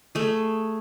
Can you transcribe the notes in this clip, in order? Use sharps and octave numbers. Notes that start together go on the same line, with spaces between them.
A3 G#4